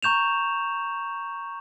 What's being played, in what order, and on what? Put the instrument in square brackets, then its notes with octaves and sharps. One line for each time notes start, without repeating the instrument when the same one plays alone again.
[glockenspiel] A#5 C#6 G6 E7 F7